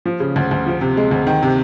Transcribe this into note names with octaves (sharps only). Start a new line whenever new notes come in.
F3
C#3
D2
D2
F3
C3
G#3
D2
D#3
C3